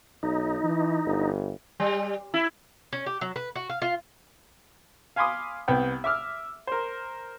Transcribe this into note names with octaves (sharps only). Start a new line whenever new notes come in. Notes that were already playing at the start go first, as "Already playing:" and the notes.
B1 D#4
E3
G1
G3
E4
C#4
G4
F#3
B4
F#4
F5
F4
F5 G#5 B5 C6 D6 D#6
C2 B3 G5
E5 D6 F6
A#4 C5